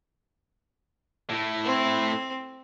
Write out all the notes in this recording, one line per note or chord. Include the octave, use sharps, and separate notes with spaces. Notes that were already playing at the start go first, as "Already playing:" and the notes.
A2 A3
C4